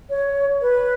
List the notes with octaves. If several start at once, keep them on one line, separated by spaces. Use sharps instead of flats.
C#5
B4